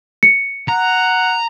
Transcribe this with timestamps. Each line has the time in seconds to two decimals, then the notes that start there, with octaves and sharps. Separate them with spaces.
0.23 C#7
0.69 F#5 A#5